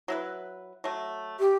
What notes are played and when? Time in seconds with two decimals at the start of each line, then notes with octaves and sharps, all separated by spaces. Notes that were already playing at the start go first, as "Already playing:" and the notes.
0.08 F#3 E4 B4
0.84 F#3 A3
1.40 G4